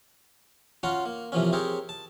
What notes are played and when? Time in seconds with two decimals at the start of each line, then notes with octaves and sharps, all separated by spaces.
0.83 C#4 F4 F#4 F#5 A#5 C6
1.06 A#3
1.32 C3 E3 F3 A#3 C#4
1.53 C4 G4 G#4 A#4 C#5
1.89 A5